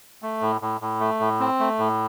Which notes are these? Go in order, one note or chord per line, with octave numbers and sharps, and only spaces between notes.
A3
A2
A2
A2
A3
A2
C4
A3
A2